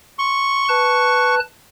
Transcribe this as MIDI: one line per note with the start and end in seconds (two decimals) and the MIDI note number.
0.19 0.64 84
0.19 1.35 85
0.69 1.40 71
0.69 1.40 81
0.69 1.40 90